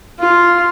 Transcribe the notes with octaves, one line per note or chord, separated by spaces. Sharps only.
F4